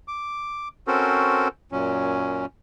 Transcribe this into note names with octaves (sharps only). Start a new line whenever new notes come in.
D6
C4 C#4 F#4 A4 A#4 C5
F#2 A#2 F#3 C#4